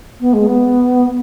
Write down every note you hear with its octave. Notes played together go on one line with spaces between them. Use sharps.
B3
G#3
B3